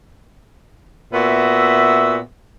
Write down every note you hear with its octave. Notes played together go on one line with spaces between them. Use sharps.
A#2 B3 F#4 E5